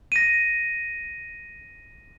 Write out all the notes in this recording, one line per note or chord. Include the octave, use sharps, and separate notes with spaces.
A#6 D#7